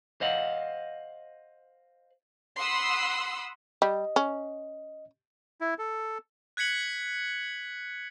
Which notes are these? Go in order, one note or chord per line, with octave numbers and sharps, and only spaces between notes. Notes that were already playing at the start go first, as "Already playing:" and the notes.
C5 D#5 F5 F#5
F#5 B5 C6 D#6 E6
G3 D#5
C#4
E4
A4
F#6 G#6 B6 C#7 F#7